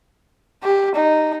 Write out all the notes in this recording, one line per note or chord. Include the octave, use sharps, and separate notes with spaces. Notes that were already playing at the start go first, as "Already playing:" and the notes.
G4
D#4